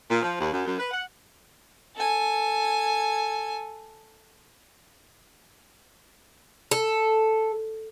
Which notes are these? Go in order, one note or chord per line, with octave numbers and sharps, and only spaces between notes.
A#2
F3
D#2
F#2
F#2
B4
F#5
A4 G#5
A4